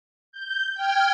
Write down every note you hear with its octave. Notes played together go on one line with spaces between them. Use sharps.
G6
G5 F6 G#6